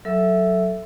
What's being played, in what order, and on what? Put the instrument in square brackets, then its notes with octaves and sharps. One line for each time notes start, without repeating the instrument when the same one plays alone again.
[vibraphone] F#3 A4 E5 E6